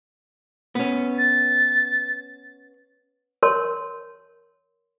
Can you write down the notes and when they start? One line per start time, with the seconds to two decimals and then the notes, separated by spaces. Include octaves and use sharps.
0.75 B3 C#4
1.18 A6
3.43 A#4 C#5 C6